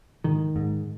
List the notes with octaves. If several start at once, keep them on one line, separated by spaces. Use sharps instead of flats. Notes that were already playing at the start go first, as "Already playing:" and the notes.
G#2 D#3
G#2